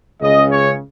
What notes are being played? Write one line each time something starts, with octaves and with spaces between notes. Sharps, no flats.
C#2 C#3 D#5
C#5